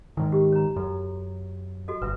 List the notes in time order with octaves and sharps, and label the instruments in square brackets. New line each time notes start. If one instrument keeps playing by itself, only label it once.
[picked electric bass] G#2 D#3
[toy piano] G4
C#5 A#5
[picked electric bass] F#2 [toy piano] A4
[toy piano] F#4 A4 D#5
[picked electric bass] G1 [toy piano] B4 E5